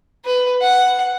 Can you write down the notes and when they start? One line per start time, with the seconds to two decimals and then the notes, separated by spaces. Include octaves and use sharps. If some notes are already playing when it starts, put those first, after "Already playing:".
0.25 B4
0.61 F#5